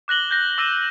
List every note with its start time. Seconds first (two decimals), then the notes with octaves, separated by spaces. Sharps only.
0.08 D6 F#6 A#6 F#7 G7
0.31 G6 A#6
0.58 D6 E6 A#6 D#7 E7